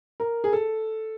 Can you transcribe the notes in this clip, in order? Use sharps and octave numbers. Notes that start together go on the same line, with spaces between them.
A#4
G#4
A4